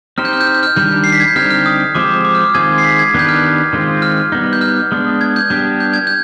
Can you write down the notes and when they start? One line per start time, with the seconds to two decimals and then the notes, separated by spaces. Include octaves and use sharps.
0.18 C4 D#4 G4 C5 F6
0.25 G6
0.33 F6
0.41 G6
0.47 F6
0.55 G6
0.63 F6
0.76 D#3 G3 D4 G4 G6
1.04 C7
1.12 B6
1.20 G#6
1.28 G6
1.36 D3 G3 C4 D#4 G4 F6
1.44 G6
1.50 F6
1.66 D#6
1.95 F3 G#3 C4 G4 C5 D6
2.24 D6
2.35 F6
2.45 F6
2.54 D#3 G#3 C4 F4 G#4 G#6
2.78 C7
2.84 B6
2.99 G#6
3.14 D#3 B3 D4 G4 B4 G6
3.29 F6
3.73 D#3 G#3 C4 F4
4.02 F6
4.32 G3 B3 D#4
4.53 G6
4.61 F6
4.92 G#3 B3 D4
5.21 G#6
5.36 G6
5.50 G3 B3 D4 G4
5.80 G6
5.94 G#6
6.07 G6